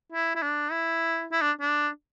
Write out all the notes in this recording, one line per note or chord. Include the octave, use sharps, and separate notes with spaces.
E4
E4
D4
E4
E4
D4
D4